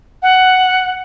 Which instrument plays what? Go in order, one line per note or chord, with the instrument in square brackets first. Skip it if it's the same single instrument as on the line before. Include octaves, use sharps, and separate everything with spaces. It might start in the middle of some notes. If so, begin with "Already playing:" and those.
[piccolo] F#5